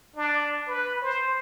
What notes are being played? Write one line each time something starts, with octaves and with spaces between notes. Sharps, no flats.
D4
B4
C5